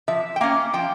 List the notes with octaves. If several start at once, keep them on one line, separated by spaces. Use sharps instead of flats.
F3 E5
G5
A#3 C#4 F5
F3 G5